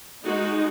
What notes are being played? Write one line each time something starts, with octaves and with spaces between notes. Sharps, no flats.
G#3 D#4 F#4